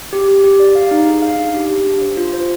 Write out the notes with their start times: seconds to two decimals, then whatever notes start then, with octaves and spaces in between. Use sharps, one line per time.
0.13 G4
0.28 G4
0.44 G4
0.60 D5
0.75 F5
0.91 D#4
1.07 G#4
1.22 F5
1.39 D4
1.54 G4
1.70 G4
1.86 D4
2.01 C5
2.17 F4
2.33 C5